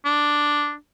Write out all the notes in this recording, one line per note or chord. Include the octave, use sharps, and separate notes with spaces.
D4